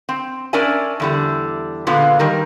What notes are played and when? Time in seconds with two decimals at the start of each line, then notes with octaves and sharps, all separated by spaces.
0.09 C4
0.53 C#4 D4 A#4 D5 E5 G#5
1.00 E2 D3 G3
1.87 A#2 D3 G#3 B3 F4
2.19 D#3 G3 A#4